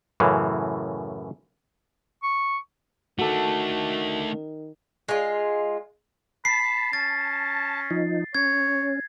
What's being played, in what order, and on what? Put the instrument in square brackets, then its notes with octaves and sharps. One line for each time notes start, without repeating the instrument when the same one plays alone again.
[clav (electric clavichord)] F#2 A2 C#3 E3
[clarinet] C#6
[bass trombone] D#3 [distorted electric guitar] A3 D4 [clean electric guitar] F#4 A4
[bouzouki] G#3 F4
[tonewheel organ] A5 [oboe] B5 [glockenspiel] C7
[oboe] C#4 [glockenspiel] A6
[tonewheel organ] F3 D#4
[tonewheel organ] C#4 [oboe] C#5 [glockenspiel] G#6